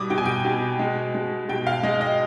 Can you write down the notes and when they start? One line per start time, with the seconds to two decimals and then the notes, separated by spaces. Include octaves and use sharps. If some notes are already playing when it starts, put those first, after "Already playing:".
Already playing: B2 G3 D6 D#6
0.10 B2 G5
0.18 G#5
0.26 G5
0.45 B2
0.79 G#3
1.15 G#3
1.49 B2 G5
1.67 F5
1.83 G#3 D#5
2.01 D#5